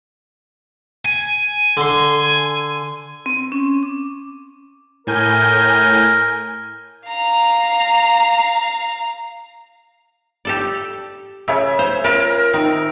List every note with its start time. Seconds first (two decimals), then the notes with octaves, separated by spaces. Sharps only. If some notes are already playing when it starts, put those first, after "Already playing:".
1.05 G#5
1.77 D3 C6
3.26 C4
3.52 C#4
3.83 D6
5.07 A2 A#4 G#5 G6
7.08 F5 A#5
10.45 G4 A4 D5
11.48 C#3 E5 G#5
11.79 C5
12.04 C#4 F4 A#4 B4
12.53 D#3 C4